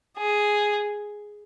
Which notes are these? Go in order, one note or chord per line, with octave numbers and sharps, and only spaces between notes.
G#4